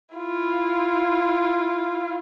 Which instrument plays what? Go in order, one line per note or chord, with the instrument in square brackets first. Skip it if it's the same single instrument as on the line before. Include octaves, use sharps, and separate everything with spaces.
[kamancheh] E4 F4